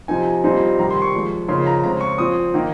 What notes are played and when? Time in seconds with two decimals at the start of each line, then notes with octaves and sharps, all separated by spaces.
0.08 C3 F3 C4 D#4 G#5
0.44 A#2 G3 C4 D#4
0.78 C3 D#3 G3 A#5
0.91 C6
1.02 C#6
1.14 A#2 F3 G#3
1.48 C#3 F3 A#3 D#4 C6
1.66 A#5
1.84 C#3 G#3 C4 A#5
2.01 C#6
2.18 A#2 F3 C4 D#6
2.54 D#3 A#3 D#4